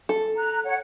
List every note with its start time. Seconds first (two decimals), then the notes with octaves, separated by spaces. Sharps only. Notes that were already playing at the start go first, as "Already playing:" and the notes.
0.09 A4
0.37 A#5 F#6
0.64 C#5 F#5